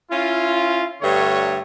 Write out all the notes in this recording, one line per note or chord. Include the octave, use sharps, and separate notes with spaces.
C#4 E4 F4
G2 D3 A3 C#5